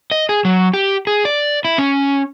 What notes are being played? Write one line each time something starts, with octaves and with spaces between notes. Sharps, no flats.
D#5
G#4
F#3
G4
G#4
D5
E4
C#4